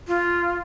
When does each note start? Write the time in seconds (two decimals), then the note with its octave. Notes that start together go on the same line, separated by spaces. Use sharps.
0.08 F4